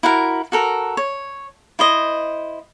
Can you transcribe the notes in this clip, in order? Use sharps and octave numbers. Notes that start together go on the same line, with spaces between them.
E4 F#4 A#4
F#4 A4 A#4
C#5
E4 C5 D#5